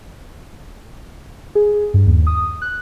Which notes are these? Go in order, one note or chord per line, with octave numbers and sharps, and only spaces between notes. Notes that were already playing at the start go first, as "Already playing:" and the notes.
G#4
G2
D#2
D#6
F#6